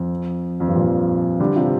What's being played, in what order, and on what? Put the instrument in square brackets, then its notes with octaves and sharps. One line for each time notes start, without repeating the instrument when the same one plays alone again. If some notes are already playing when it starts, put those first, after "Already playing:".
Already playing: [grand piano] F2
F2
G2
F2 A#2
D3 G3
C3 F3